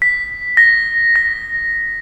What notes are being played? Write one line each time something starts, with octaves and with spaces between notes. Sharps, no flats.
B6
A#6
A#6